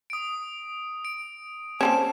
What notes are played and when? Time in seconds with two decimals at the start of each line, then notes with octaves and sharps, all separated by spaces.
0.10 D#6 D7
1.05 D7
1.81 A#3 C4 C#4 A5 E7